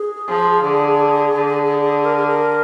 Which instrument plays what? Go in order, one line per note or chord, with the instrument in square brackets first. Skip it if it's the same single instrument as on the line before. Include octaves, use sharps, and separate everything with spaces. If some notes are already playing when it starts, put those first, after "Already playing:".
Already playing: [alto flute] G#4
[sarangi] F3
D3
D3
[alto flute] A#4
G#4
A#4